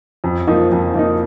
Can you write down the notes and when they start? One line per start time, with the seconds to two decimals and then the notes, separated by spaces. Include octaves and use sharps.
0.24 F2
0.47 F3 A#3 D#4
0.72 F2
0.94 F3 A#3 D#4